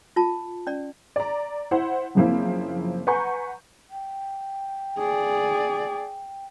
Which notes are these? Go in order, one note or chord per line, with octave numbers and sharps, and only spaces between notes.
F4 A5
C#4 D5
D5 A#5
E4 C5 F#5
F#2 C#3 F3 A#3 C4 E4
B4 F#5 G#5 A#5 C#6 G6
G5
G#4 D5